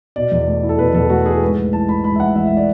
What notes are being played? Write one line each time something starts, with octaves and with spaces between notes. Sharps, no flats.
B2 D5
E2
A3
E4
A4
B2 B4
E2 A4
A3 F#4
E4 G#4
G#2 B4
A1
E3 A5
A3 B5
G#2 B5
E5
A1 F#5
E3 E5
E5
A3
D5